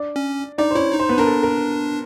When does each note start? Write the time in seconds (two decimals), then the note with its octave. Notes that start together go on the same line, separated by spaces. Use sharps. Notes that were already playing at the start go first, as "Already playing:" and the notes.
Already playing: D4 D5
0.16 C#4
0.58 D4 D#4 D5
0.71 C5
0.75 C#4 E4 C#5
0.93 D#4
0.99 C5
1.09 B3 B4
1.18 D4 A#4
1.26 A4
1.43 A#4